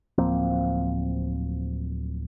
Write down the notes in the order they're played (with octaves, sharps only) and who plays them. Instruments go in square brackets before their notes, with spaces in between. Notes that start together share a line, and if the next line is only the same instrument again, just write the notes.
[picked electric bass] D1 F3 A#3 C4